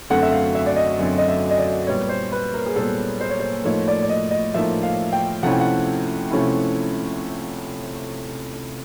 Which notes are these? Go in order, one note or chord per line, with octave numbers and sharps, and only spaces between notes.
F#2 D3 F#3 A3 C4 F#5
E5
F5
E5
D5
D#5
F#2 D3 F#3 A3 C4
D#5
E5
D#5
D5
A#2 G3 B3 C#5
C5
B4
A#4
G#4
A#2 G3 B3 A4
C5
C#5
C5
A2 F3 A#3 D#4 C#5
D5
D5
D#5
D#5
A2 F3 A#3 D#4 E5
F5
G5
C3 F3 A3 C#4 E4 F#5
G5
F#5
C3 F3 A3 C#4 E4